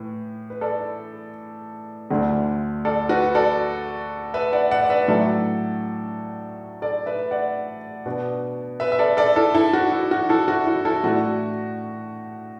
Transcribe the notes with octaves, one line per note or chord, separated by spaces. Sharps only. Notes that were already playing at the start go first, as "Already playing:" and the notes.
Already playing: A2 E3
B4
A4 D5
D2 D3 A3 D4
A4 D5
F#4 B4
A4 D5
B4 E5
D5 F#5
D5 F#5
D5
B4 E5
A2 F#3 D4 A4 D5
A4 D5
B4 E5
D5 F#5
B2 B3 D4
B4 E5
E5
A4 D5
A4 D5
E4 A4
E4 A4
F#4
E4
F#4
E4 A4
F#4
E4
E4 A4
A2 A3 D4 F#4